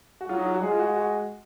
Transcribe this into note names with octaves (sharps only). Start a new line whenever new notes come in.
F#4
F#3 F4
D#4
F4
F#4
G#3 G#4
F4
F#4
F#4